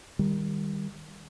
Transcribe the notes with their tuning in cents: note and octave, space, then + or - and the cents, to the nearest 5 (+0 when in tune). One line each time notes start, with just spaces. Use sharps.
D#3 +0 G3 +20